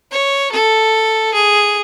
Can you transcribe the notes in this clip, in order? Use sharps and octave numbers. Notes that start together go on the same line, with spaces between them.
C#5
A4
G#4